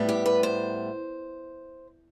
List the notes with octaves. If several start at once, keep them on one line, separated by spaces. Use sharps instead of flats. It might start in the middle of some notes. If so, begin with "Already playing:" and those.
Already playing: A2 G3 B3
G4
B4
C5